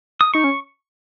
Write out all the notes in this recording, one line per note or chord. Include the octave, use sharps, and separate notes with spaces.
D#6
D#4 C#6
C#4